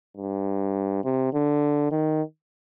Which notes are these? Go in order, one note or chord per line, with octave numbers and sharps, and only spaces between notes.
G2
C3
D3
D#3